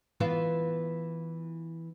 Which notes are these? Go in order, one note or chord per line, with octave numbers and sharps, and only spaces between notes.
E3 B3 F4